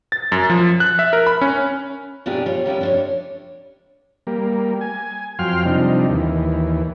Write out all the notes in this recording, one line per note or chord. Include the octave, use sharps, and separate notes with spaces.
A6
F#2
F3
F#6
E5
A#4
B5
C#4
B2 A#3 D4 E4 G4 G#4
F4 C#5
D#3 G3 C#4 E4
D4 C5 C#5
G3 A#3
G#5
F2 F#3 F5 G5 C6 F6
C3 F3 G3 D4 D#4
D#2 E3